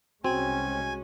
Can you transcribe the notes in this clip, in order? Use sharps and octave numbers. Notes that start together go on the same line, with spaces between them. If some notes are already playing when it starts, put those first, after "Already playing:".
C2 G#3 C4 C#4 F#4 G#5